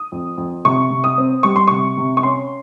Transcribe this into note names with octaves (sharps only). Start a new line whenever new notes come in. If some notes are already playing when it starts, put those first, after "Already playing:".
Already playing: D#6
F2
F2
C3 C#6
C3
D#6
C4
G3 C#6
C6
C3 C#6
C3
C#6
C#4 C6